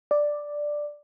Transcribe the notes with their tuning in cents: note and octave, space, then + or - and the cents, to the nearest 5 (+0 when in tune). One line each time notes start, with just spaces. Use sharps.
D5 +5